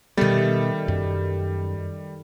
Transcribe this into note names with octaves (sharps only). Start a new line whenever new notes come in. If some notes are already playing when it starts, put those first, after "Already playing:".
B2 D#3 G3 A3 B3
F#2